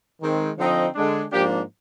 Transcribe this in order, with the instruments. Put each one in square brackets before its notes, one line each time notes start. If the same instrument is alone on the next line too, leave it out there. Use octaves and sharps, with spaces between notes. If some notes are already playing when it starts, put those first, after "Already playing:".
[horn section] D#3 G#3 C4
D3 F3 C4 D#4
D3 G#3 D4
G#2 F3 A#3 D4 G4